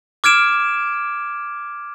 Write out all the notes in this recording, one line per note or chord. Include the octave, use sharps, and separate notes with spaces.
D6 F6 G#6 D7 E7